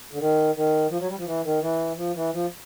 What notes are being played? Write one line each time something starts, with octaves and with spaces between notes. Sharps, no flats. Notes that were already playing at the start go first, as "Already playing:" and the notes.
D3
D#3
D#3
F3
F#3
G3
F3
E3
D#3
E3
F3
E3
F3